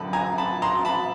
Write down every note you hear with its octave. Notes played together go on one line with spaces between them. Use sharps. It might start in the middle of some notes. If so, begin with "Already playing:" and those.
Already playing: F#2 D3 A5 B5
G#5 A#5
A5 B5
A#5 C6
A5 B5